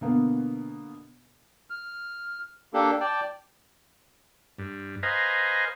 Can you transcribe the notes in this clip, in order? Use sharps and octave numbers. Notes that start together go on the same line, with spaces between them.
B2 D3 A#3 B3
F6
A#3 D4 G4 A4
D5 G5 A5
G2
B4 C5 D#5 F5 G#5 A#5